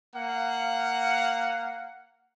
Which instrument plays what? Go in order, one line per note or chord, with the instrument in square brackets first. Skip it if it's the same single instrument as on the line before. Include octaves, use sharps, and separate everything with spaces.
[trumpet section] A#3 F5 F#5